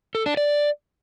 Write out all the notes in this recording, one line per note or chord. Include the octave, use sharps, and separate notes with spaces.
A4
D4
D5